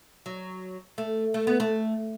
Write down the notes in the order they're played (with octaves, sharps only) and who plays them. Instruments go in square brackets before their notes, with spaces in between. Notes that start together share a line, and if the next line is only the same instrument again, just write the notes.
[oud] F#3
A3
A3
B3
A3